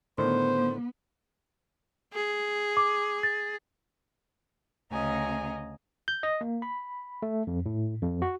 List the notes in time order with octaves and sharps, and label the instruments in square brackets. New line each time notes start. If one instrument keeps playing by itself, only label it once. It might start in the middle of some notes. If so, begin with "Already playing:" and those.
[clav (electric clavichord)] A2 D3 D#3 [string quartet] B3 [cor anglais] C5
[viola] G#4
[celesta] D6
A6
[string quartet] D2 C#3 D#5 G#5 A#5
[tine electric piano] G6
D#5
A#3
B5
A3
F2
A2
F2
F#4